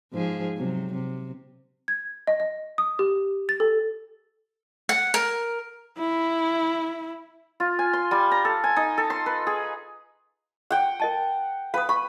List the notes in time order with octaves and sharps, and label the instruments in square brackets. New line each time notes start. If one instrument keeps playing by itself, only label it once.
[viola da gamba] G#2 F3 G#4
C3 F#3
C3
[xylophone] G#6
D#5
D#5
D#6
G4
A6
A4
[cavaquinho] F#5
A#4
[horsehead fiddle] E4
[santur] F4
G#5
C6
G3
A#5
A4
G#5
D#4
A4
C6
B4
G#4
F#5 G5
[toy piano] A#4 D#5 A5
[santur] B4 [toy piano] F5 D#6
[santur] B5 [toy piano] C#6